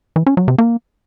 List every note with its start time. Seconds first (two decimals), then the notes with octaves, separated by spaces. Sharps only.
0.16 E3
0.26 C#4
0.37 F#3
0.48 C3
0.58 A#3